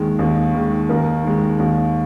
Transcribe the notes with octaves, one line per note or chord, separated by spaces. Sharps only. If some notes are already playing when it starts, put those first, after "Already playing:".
Already playing: D#2 D#3 G#3
D#2
D#3 G#3
D#2 A#4
D#3 G#3
D#2